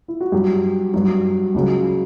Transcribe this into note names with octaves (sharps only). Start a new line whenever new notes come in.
E4
F#4
G2 F#3 G4
G2 F#3
C#2 C#3 F#3